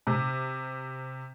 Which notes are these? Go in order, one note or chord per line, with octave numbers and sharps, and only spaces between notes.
C3